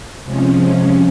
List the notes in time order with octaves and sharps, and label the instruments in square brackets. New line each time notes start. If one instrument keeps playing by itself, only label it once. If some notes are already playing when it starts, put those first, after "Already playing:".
[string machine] C3 F3 G#3 C#4